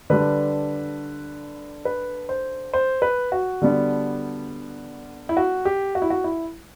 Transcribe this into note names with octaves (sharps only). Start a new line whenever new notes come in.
D3 G3 D4 B4
B4
C5
C5
B4
F#4
D3 G3 B3 D4
E4
F#4
G4
F#4
E4
F#4
E4